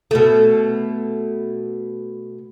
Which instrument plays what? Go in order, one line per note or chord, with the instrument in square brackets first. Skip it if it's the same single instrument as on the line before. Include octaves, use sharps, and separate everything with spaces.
[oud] B2 A3